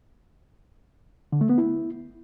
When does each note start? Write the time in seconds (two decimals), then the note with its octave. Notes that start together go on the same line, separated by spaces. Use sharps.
1.33 D3
1.41 A3
1.49 B3
1.58 E4